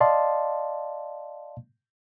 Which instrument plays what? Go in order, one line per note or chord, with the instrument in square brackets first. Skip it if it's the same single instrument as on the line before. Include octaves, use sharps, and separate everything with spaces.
[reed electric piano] D5 D#5 F5 A5 C6